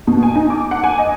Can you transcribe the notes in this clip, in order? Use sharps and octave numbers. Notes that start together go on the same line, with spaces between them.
B2
G#5
D#4
D6
F#5
G#5
D#5